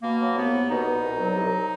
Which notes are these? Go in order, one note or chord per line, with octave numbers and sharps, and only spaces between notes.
B2 A#3
F#3
C2 B3
C2
B2 D#4
B2
C2
F#3
C2